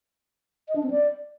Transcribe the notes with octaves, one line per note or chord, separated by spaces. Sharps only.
D#5
D4
C4
D5